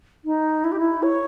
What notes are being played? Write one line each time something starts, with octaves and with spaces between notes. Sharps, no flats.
D#4
E4
G4
E4
C#5